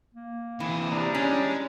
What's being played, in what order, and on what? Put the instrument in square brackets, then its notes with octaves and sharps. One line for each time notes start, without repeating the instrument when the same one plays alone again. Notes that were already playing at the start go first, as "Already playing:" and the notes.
[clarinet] A#3
[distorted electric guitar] C3 G#4 [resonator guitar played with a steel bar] E3
[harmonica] G3 D4 [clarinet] A#5
[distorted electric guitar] G#3 [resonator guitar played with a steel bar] C#4